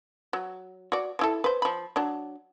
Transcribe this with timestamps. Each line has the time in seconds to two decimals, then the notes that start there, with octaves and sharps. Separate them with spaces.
0.33 F#3
0.92 F#4 D5
1.19 F3 E4 A4
1.44 B4 C5
1.62 F3 B5
1.96 F#3 D4